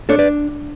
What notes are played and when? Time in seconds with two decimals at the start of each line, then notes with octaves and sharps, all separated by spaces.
0.09 D4 A4 C#5
0.19 B4 D5